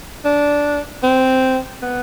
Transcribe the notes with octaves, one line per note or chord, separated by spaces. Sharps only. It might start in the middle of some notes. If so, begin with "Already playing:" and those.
D4
C4
B3